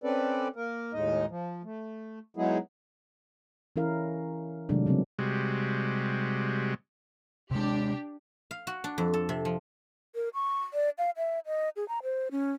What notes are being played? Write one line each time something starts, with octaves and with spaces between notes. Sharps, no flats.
C4 C#4 A4 B4 D5
A#3 A#4
D#2 A2 G#3 D#4 D#5
F3
A3
F#3 G#3 B3 D#4 E4 G#4
E3 C#4 E4 A#4 F5
C3 D#3 F#3 G#3 A3 D4
C#3 F#3 G3 B3 C4
C3 G3 G#3 F#4
C3 G#3 D4 G4
F5
F#4
D4
F2
A4
C3
F3
A#4
C#6
D5
F5
E5
D#5
G#4
A#5
C5
C#4